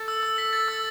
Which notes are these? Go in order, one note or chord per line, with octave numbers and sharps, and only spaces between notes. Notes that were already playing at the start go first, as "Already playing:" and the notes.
Already playing: A4
E6
E6
B6
A6
E6